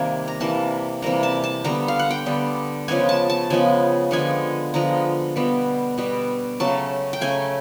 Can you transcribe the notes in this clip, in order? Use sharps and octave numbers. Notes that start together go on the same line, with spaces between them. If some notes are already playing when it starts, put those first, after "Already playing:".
Already playing: C3 D#3 G3 A#3 G#5
A#5
C3 E3 G3 A#3 A5
C3 E3 G3 A#3 A#5
A5
A5
D3 G3 B3 A#5
F5
F#5
G5
D3 G3 B3
C#3 F3 G#3 B3 G#5
A5
A5
C#3 F3 G#3 B3 G#5
D3 F3 G#3 B3 G#5
D3 F3 G#3 B3 A#5
B2 G3 B3
B2 G3 B3
C#3 F#3 A3 A5
G5
C#3 F#3 A3 G#5